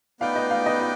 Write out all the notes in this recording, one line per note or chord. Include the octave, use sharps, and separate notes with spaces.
B3 D#4 B4 D5 F5 G5
D#5
F5
D#5
D#5